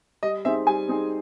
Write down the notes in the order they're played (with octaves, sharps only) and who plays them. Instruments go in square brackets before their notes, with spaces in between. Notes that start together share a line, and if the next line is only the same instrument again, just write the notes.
[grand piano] G3 [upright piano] D#5
[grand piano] C4 D#4 G#4 [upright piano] E5
[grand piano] G3 [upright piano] G#5
[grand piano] C4 D#4 G#4